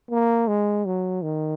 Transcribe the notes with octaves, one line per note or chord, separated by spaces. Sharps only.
A#3
G#3
F#3
D#3